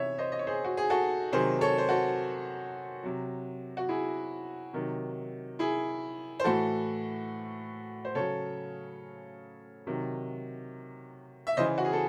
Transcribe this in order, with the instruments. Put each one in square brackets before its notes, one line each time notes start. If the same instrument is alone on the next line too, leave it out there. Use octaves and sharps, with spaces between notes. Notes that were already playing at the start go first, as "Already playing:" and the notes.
Already playing: [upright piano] C3 E3 C#5 E5
C5 D#5
D#5
C#5
G#4 C5
F#4
G#4
F#4 A4
C3 D#3 F#3 G#4 C5
A4 C#5
C5
F#4 A4
C3 F#3
F#4
E4 G#4
C3 D#3 F#3
E4 G#4
C5
A2 E3 F#4 A4
C5
C#3 F#3 A4 C#5
C3 D#3 F#3
E5
C#3 E3 C5 D#5
F#4
G#4
A4